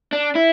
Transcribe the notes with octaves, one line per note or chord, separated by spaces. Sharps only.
D4
E4